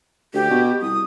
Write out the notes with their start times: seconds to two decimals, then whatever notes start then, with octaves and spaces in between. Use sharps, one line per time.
0.34 D2 G4
0.50 B2
0.81 C2 D#6